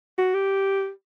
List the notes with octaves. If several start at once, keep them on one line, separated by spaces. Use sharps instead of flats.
F#4
G4